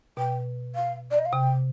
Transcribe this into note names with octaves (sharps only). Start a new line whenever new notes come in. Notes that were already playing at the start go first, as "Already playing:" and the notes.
B2 G5
F5
D5
D#5
F5
C3 G5